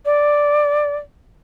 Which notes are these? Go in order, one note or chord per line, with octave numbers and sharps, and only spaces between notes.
D5